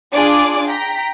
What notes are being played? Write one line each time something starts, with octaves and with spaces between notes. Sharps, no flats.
D4 F4 G#4 D5 D6
G5 A#5 B6